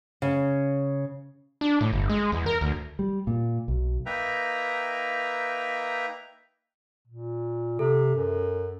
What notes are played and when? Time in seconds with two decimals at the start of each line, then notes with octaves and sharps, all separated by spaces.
0.22 C#3
1.61 D4
1.81 A2
1.93 G1
2.10 G#3
2.32 E2
2.46 A#4
2.61 D2
2.99 G3
3.27 A#2
3.68 B1
4.06 A#3 D#4 B4 E5 G5 A#5
7.08 A#2
7.79 C3 A4
8.15 F#2